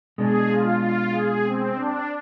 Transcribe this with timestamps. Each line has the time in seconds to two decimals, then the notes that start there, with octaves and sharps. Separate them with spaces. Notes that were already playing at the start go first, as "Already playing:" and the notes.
0.18 B2 G#3 D4 G#4
0.49 F4
0.81 F4
1.12 G#4
1.44 C4
1.75 D4